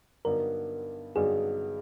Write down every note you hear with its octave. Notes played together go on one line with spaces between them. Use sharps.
G2 D3 F#3 B3 D#4 A#4
G2 D3 F#3 B3 D#4 G#4